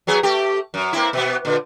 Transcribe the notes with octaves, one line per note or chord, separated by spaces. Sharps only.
F#3 B3 G#4
A3 G4
F#2
A#3 C4 E4
B2 B3
A#2 D3